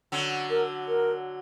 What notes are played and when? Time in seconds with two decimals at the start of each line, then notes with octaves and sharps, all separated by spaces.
0.12 D3 F#3
0.50 A#4
0.88 A#4